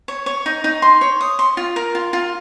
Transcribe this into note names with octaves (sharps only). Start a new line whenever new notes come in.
C#5
C#5
D#4
D#4
C6
C#5
D#6
C6
F4
A#4
F4
F4